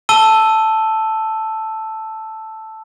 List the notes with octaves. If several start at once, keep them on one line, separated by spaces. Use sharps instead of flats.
A5 E6 D#7 G7